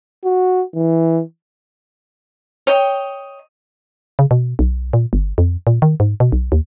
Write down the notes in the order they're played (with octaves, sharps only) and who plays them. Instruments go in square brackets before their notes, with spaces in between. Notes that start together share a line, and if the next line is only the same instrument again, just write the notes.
[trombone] F#4
E3
[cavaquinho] C#5 D#5 G5
[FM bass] C#3
B2
B1
A#2
G1
F2
A#2
D#3
G#2
B2
B1
D#2